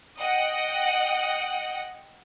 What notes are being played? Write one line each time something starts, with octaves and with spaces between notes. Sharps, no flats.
D#5 F#5 G5